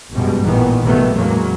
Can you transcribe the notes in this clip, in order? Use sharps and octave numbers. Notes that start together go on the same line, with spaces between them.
G1 F#2 B2 G3 G#3
A1 E2 A#2 D#3 E3 B3
A1 C3 D#3 F#3 A3 B3
E2 A2 C#3 F#3 G#3 A#3